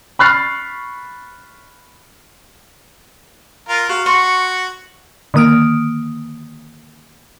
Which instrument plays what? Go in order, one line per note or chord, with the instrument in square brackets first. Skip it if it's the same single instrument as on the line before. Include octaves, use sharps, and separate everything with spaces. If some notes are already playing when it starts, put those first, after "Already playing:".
[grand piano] B5 C#6 F6 F#6 A6 C7
[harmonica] F4 A#4
[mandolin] F#4 [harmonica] F5
[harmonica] F#4 [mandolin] C6 C#6
[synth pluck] D3 D#3 A#3 D#6 F6 D7